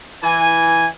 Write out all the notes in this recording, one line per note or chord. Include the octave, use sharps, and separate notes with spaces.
E3 G#5